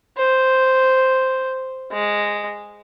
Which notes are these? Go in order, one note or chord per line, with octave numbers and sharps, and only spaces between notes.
C5
G#3